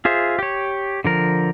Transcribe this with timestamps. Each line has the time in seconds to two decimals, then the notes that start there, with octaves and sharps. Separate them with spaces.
0.05 F4 G#4 C5 E5
0.39 G4 C#5
1.05 D3 F3 A#4